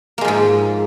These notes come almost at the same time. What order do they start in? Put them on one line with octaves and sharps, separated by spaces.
A#3 G#3 F3 G#2